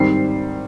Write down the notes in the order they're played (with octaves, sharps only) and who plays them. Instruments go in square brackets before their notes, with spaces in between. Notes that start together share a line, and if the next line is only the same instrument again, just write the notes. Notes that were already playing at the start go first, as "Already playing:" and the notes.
Already playing: [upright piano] G#2 D#3 G3 C4 C7